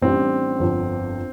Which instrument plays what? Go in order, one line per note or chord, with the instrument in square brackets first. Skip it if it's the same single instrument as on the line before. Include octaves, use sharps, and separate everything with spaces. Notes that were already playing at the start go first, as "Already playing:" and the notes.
[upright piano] A1 A2 G3 D4 G4 [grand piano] C4
[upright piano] G1 F2 D3